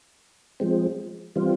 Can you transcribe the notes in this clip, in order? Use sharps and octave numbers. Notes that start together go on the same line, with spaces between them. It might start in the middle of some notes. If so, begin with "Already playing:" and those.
F3 G#3 C4
E3 G3 C4 F4